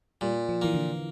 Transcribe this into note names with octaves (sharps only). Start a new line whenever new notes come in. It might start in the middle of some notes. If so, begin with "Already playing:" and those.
A#2 G3
F3
E3 A#3
D3